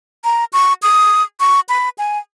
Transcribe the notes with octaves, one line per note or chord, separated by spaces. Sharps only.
A#5
C#6
D#6
C#6
B5
G#5